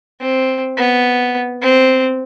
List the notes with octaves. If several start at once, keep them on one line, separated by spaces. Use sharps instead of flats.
C4
B3
C4